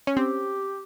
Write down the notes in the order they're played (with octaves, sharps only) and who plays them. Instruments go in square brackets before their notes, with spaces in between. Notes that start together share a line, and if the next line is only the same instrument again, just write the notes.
[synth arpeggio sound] C#4
[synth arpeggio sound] C4 [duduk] G4